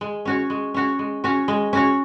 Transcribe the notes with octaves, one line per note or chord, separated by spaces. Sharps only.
G#3
C#4 F#4 C#5
G#3
C#4 F#4 C#5
G#3
C#4 F#4 C#5
G#3
C#4 F#4 C#5